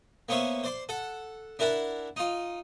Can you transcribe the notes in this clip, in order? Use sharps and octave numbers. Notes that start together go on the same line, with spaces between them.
A#3 B3 C#4 C5 C#5 E5
C5 D5 C6
A4 F#5
D4 E4 A#4 F#5 A5 B5
D#4 F4